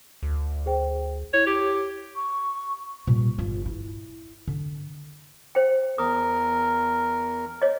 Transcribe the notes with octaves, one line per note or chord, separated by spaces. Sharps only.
D2
G#4 C5 G5
E4 C#5
G4
C#6
A#2 G3
G1 F4
E4
D3
C5 G5
E2 A#4 D#6
C#5 D#5